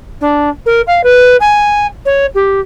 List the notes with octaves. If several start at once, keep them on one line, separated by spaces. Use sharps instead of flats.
D4
A#4
F5
B4
G#5
C#5
G4